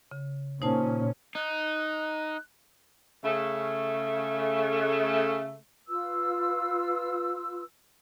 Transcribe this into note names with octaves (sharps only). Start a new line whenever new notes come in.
C#3
A#2 C#4 D#4 C5 A5
D#4 F#6
C#3 A3
F4 B4 E6